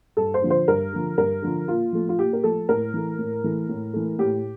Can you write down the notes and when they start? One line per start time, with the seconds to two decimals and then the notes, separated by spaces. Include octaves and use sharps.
0.17 G2 A4
0.34 C5
0.42 D3 F3
0.50 C5
0.68 G2 A#4
0.92 D3 F3
1.18 G2 A#4
1.42 D3 F3
1.68 A#2 F4
1.93 F3 A3
2.09 F4
2.18 A#2 G4
2.33 A#4
2.43 F3 A3 A4
2.69 A2 A#4
2.94 E3 A3
3.18 A2
3.44 E3 A3
3.69 A2
3.93 E3 A3
4.18 A2 G4